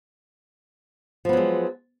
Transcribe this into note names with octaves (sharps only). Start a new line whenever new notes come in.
F3 F#3 G#3 B3